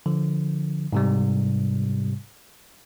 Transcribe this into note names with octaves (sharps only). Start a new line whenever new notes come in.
D3 F3
G#2 C3 G3